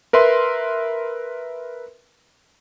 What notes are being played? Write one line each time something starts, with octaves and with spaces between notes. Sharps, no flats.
A#4 B4 E5 C6